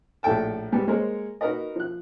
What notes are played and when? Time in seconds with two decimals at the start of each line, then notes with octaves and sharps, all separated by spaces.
0.23 A#1 A2 A4 G5 A5
0.72 G#2 G3 B3
0.88 G#3 A#3 A#4 C5 C#5
1.41 D#4 F#4 A#4 B4 D#5
1.76 F3 F#6